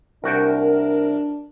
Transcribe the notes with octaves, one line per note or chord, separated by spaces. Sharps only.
C2 D4 F#4 A#4 G5